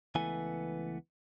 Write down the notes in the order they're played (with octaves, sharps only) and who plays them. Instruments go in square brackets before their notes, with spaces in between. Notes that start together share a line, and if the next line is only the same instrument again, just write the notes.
[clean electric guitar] C#2 E3 A3 B3 G#5